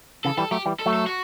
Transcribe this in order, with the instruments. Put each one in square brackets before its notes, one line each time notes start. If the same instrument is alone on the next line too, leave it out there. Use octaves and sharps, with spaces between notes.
[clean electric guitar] C#3 E3 [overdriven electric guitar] A4
[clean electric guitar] E3 G3 [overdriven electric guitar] A4
[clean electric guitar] F#3 A3 [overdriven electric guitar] G4
[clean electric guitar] E3 G3
[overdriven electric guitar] A4
[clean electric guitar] F#3 A3
[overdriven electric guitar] A4
F#4